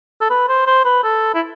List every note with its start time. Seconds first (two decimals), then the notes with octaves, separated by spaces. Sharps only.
0.21 A4
0.30 B4
0.48 C5
0.67 C5
0.85 B4
1.04 A4
1.34 E4